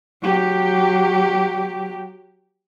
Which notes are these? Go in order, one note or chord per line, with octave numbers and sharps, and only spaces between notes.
F#3 G4